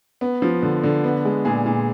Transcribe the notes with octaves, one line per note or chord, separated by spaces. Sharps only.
B3
F3
D3
D3
B3
G#3
A#2 G#4
A#2